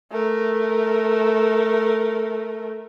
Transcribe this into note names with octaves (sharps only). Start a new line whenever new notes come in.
A3 A#4